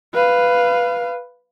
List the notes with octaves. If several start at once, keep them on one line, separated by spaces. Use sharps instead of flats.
B4 F5